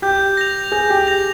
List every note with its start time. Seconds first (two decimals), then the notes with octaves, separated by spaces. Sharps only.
0.02 G4 G6
0.37 A#6 F7
0.72 G#4 G6
0.90 G4
1.07 A#6 F7